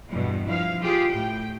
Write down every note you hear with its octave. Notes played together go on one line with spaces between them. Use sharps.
E2 G2 B2
F3 E4 F5
F4 G4 G#4
A2 G5